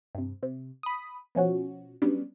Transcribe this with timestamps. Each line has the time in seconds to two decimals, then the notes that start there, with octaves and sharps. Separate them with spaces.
0.15 G2 C3
0.43 C3
0.83 B5 D#6
1.35 B2 F3 C#4 F#4
2.02 F#3 G3 B3 C#4 D4